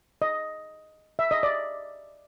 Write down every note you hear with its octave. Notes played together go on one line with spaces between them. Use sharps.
D#5
E5
D#5
D5